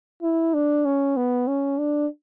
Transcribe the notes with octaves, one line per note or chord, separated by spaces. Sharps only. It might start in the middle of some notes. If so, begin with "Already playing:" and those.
E4
D4
C#4
B3
C#4
D4